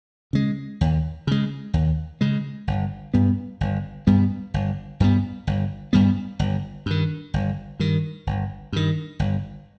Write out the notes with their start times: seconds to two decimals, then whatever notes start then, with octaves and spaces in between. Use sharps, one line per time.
0.33 C#3 G#3
0.81 D#2
1.27 C#3 G#3
1.74 D#2
2.21 C#3 G#3
2.67 G1
3.14 G2 G3 B3
3.61 G1
4.07 G2 G3 B3
4.54 G1
5.00 G2 G3 B3
5.47 G1
5.93 G2 G3 B3
6.39 G1
6.86 G2 D#3
7.34 G1
7.80 G2 D#3
8.27 G1
8.73 G2 D#3
9.19 G1